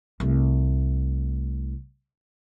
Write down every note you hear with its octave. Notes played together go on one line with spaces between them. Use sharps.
C2 A3